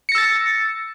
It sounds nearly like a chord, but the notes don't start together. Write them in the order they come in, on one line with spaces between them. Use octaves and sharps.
C#7 A#6 E6 A6